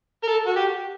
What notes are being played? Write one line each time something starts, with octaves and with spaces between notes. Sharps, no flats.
A#4
A4
F#4
G4